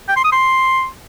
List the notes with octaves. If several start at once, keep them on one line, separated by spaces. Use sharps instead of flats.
G5
C6
D#6
C6